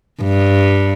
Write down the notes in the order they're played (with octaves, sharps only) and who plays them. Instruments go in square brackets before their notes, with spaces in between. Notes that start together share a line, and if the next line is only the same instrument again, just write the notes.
[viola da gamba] G2